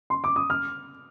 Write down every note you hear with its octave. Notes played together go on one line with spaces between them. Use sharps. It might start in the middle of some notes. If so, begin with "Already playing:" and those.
C6
D6
D#6
F6